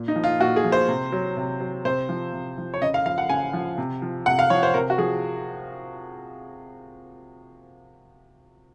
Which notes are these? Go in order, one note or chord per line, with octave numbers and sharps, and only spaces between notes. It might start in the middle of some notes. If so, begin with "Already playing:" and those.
Already playing: A#2
D#4
F3
F4
A#2 F#4
G#4
F3
C5
C3
F#3
C3
F#3
C3 C5
F3
C3
F3
C#5
C#3 D#5
F5
F3 F5
F#5
C#3 G#5
F3
C3
F3
C3 F#5
F5
F3 C#5
C5
C3 A#4
F#4
F3 G#4